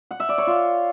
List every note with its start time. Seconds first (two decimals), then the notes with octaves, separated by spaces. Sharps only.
0.11 F#5
0.20 E5
0.29 D5
0.38 C#5
0.47 F4